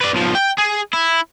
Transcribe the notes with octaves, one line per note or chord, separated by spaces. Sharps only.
B4 D5
B1 F3
G5
G#4
E4